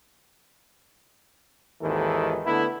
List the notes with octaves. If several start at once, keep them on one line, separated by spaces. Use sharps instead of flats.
G#1 D#2 D#3 E3 A4
D3 A3 B3 E4